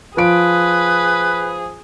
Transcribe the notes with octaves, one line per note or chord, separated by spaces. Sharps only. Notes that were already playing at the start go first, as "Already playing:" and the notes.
F3 G#4 B4 D7